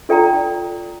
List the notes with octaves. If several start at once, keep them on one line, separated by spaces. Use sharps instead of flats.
F4 A4 D5 G5 A#5